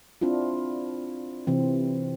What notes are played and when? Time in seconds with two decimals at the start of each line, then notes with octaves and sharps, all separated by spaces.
0.21 C4 D4 E4 F4
1.47 C3 E3 C4